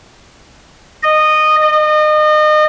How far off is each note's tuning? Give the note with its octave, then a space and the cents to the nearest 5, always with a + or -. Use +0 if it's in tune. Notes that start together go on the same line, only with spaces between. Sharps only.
D#5 -15
D#5 -30